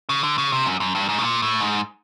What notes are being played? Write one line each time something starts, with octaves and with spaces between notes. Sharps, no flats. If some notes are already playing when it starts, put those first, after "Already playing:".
C#3
D3
C#3
C3
F#2
F#2
G2
G#2
B2
A#2
A2
G#2